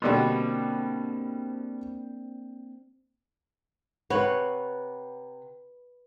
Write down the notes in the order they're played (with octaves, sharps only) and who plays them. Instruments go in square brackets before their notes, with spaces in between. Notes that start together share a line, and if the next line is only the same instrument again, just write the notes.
[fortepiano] B2 D3 G3 [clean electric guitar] A#3 C4 D4
[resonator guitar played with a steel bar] C3 C#5 F#5 [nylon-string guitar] B4